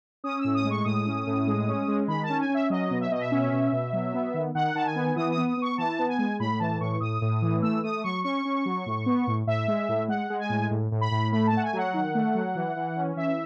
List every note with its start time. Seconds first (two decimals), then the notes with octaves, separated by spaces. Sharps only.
0.24 C#4 D#6
0.39 E6
0.44 A2
0.55 D#6
0.65 G#3
0.70 C#6
0.85 A2 D#6
1.06 C#4
1.27 A2
1.47 G#3
1.67 C#4
1.88 G#3
2.08 D#3 B5
2.23 A5
2.29 C#4
2.40 G#5
2.49 C#4
2.54 E5
2.70 F#3 D#5
2.90 B2
3.01 E5
3.11 B2 D#5
3.21 E5
3.31 C#4
3.52 B2
3.72 B2
3.93 F#3
4.14 B3
4.34 D#3
4.55 D#3 F#5
4.75 D#3 A5
4.86 G#5
4.95 B3
5.16 E3 D#6
5.32 D#6
5.37 B3
5.47 D#6
5.57 B3 C#6
5.78 E3 A5
5.99 B3
6.09 G#5
6.18 G#3
6.40 A2 B5
6.60 E3 A5
6.81 A2 C#6
7.01 A2 D#6
7.21 A2
7.42 E3
7.62 A3 E6
7.83 A3 D#6
8.04 F#3 C#6
8.24 C#4 C#6
8.45 C#4
8.65 F#3
8.86 A2
9.06 B3
9.27 A2
9.47 A2 E5
9.68 G#3
9.89 A2
10.08 G#3 F#5
10.30 G#3
10.39 G#5
10.49 A2
10.71 A2
10.92 A2
11.01 B5
11.11 A2
11.32 A3 B5
11.47 A5
11.53 A3 F#5
11.63 G#5
11.73 F#3
11.78 F#5
11.94 D#3
12.15 A3
12.35 F#3
12.55 E3
12.76 E3
12.96 C#4
13.16 E3 E5